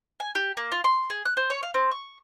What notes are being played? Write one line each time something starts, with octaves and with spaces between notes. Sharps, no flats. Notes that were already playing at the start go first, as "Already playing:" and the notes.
G#5
G4
A#3
F4
C6
G#4
F#6
C5
C#5
F5
C4
C#6